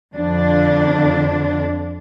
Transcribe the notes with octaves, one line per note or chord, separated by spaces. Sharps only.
F2 D3 D4